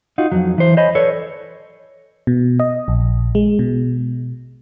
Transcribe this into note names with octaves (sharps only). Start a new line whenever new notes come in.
D#4 F4 F#4
F2 F#3
E3 C5
C5 C#5 D#5 G#5 B5
A4 B4 C#5 D5
B2
D#5
A#1
G#3
B2